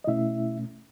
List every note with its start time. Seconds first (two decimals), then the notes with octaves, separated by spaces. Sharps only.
0.04 D#5
0.07 B2 A3 C#4 E4 E5